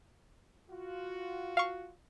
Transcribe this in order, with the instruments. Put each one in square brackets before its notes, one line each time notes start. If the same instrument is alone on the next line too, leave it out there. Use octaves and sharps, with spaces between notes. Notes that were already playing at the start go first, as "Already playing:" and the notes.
[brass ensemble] F4 F#4
[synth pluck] F5 C#6